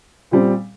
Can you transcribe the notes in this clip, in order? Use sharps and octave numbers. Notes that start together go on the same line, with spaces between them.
A#2 G3 C4